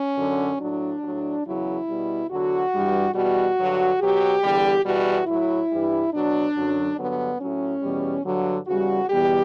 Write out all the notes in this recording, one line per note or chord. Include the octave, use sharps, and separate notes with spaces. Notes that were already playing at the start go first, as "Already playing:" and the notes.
Already playing: C#4
F#2 D3 F#3
A2 F#3 D4
A2 F#3
E2 C#3 F#3 E4
B2 G3
E2 D3 F#3 F#4
G2 E3 G3
E2 B2 G3 F#4
G2 D3 F#3
B2 F#3 G4
E2 D3 G3
E2 B2 G3 F#4
A2 F#3 E4
G2 E3 G3
B2 F#3 D4
F#2 D3 F#3
G2 D3 F#3 B3
A2 F#3 C#4
E2 B2 G3
G2 D3 F#3
E2 C#3 G3 F#4
E2 B2 G3 G4